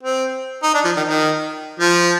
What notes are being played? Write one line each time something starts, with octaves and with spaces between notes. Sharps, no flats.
C4
D#4
D4
F3
D#3
D#3
F3